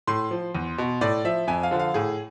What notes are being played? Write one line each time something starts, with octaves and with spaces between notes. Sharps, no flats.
A2 C6
F3
E2
B2
A2 D5
F3 E5
F2 G#5
F5
D3 F3
F5
A2 G#4